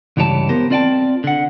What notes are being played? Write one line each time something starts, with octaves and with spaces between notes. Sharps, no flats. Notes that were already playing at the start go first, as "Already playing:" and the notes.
C#2 G2 E3 G4 C#5 A5
B3 G4 A#4 C5
C4 F4 D5 D#5 G5 A5
D3 F#5